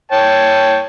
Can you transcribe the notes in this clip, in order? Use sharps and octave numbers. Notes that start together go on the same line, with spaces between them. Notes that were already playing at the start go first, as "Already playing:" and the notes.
C#5 G5 A5